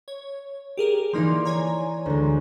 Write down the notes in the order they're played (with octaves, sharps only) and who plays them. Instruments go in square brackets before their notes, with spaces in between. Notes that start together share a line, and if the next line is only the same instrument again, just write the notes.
[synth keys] C#5
G4 G#4 A#4
[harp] E3 D5 C6 [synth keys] F3 A#3 D#4
[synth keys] C#5 G#5 A#5
[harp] D2 G#3